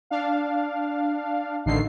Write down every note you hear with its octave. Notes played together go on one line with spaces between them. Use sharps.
D4 F5
A1 D3 D#3 C7